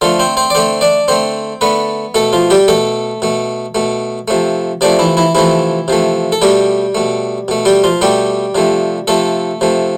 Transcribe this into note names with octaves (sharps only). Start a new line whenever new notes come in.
D3 F3 A3 F4
C4 C5
C4 C5
D5
D3 A3 C4 C5
D4 D5
D3 A3 C4 C5
D3 A3 B3 B4
B2 A3 A4
F3 F4
G3 G4
B2 A3 A4
B2 A3
B2 A3
C3 F3 A3
C3 F3 A3 D4 D5
E3 E4
E3 E4
C3 E3 F3 A3 E4
C3 F3 A3
A4
B2 G3 A3 G4
B2 A3
B2 A3
G3 G4
F3 F4
B2 G3 A3 G4
C3 F3 A3
C3 F3 A3 A4
C3 F3 A3